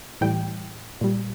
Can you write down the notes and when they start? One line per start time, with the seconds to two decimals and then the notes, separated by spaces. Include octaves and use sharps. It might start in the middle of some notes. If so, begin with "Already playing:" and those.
0.21 A2 E3 G3 G5
1.01 A#2 G3